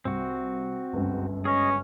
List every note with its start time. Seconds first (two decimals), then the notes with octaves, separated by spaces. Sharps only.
0.05 C2 C4 F#4
0.93 G1 C#2 F#2
1.45 C#4 G#4 D#5